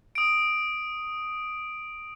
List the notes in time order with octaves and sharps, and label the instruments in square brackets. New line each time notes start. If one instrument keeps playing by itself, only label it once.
[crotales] D#6 D7